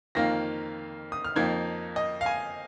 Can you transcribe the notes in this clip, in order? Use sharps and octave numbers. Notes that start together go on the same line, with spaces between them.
F2 D#3 A#3 F4 A#6
D#6
F6
F2 F3 A#3 D#4 G#6
D#5
F5
G#5